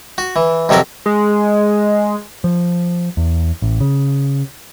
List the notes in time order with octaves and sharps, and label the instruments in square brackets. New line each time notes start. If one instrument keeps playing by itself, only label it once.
[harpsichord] F#4
E3
F2 C3 F#3 A4 A#4
[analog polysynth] G#3
[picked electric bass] F3
E2
A1
C#3